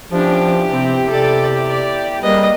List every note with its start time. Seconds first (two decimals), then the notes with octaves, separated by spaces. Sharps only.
0.12 F3 B3 C#4 D4 E4 G4
0.70 C3 C4
1.10 C3 A4 D5
1.68 D5
2.23 G3 A#3 C4 G#4 B4 D#5